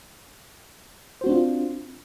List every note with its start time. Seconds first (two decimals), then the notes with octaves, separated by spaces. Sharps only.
1.21 C5
1.24 F#4
1.26 C4
1.29 D4
1.32 F4